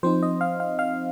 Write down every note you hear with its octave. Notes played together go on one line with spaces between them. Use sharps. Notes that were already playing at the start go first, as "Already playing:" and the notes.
F3 C4 D#4 C5
D#5
F5
F5
F5